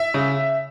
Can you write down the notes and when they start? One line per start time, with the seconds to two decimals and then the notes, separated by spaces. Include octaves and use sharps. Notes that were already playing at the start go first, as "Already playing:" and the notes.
Already playing: E5
0.14 C#3